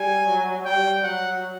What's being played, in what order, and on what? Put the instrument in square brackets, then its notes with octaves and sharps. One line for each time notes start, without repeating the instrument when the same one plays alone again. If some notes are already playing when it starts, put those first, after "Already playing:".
Already playing: [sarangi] G3 [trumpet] G#5
[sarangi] F#3
[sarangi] G3 [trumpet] G5
[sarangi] F#3 [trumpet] F#5